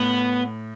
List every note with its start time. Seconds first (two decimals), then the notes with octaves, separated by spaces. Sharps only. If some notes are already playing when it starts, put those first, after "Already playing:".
Already playing: A2 B3